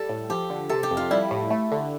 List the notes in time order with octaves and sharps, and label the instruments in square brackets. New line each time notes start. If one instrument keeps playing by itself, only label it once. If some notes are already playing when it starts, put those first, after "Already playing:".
Already playing: [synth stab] G3 [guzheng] A4
[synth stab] A2
[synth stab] F3 [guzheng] G4
[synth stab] D3
[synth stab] C3 [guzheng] A4
[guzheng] G4
[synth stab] F2
[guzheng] F4
[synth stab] G3 [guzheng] E4
[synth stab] A2
A3
D3